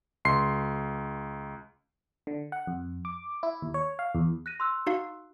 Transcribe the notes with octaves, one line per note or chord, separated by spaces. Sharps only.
C#2 C6 C7
D3
F#5
F2
D6
E4
D#2
C#5
F5
E2
F#6 A#6 D#7
C6 E6 F#6
D#4 F#4 F5